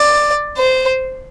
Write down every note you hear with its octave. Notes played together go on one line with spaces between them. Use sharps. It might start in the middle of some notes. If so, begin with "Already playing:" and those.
Already playing: D5
C5